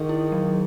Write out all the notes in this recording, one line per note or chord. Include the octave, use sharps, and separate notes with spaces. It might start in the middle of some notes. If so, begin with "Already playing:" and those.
Already playing: D#3 G#4
E4
F#3